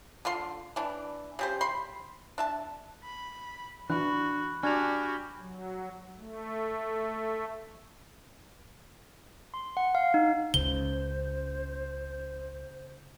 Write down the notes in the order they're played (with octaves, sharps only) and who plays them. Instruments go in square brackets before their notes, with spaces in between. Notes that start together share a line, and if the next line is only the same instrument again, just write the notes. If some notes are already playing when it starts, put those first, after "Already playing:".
[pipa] D3 F4 C6
E3 D4
C#3 G4 C5
B5 C6
D4 E5 A5
[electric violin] B5
[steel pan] E3 [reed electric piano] D4 [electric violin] F#4 [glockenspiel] B5 F#6
[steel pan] D4 [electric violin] F#4 G4 [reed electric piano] G#5 [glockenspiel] F6 G#6 F7
[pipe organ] F#3
A3
[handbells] C6
F#5
F5
D#4
[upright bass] C#2 [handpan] C#3 [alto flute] C5 [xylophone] G7